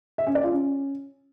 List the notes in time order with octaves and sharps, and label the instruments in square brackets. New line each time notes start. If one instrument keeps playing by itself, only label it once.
[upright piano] E5
C#4
D5
F4
C#4